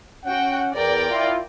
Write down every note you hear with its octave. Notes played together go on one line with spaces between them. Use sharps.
C#4 F#4 F#5 G5
E2 A#4 D5 G5
E4 F4